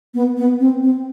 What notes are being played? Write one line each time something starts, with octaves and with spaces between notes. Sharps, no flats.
B3
B3
C4
C4